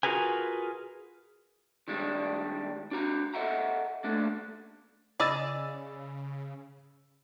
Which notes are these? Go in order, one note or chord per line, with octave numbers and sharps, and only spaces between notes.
F4 F#4 G#4 A#4 B4 G#5
D#3 G3 G#3 D4
D4 F#4 A#5
A4 B4 D#5 E5 F#5 A#5
A3 A#3 D4 A4
C#3 G#4 D5 D#5 B5 E6 A6